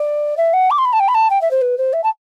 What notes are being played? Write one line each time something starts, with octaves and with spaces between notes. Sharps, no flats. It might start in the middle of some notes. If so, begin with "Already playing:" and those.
Already playing: D5
E5
F#5
D6
C6
B5
A5
G5
B5
A5
G5
E5
C5
B4
C5
E5
A5